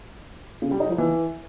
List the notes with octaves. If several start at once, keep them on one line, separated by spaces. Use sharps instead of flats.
C#3
G3
D#4
F3
E3